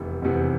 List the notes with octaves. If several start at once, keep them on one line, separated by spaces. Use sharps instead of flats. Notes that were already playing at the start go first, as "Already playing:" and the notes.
Already playing: F1 E2 C3
F1 E2 C3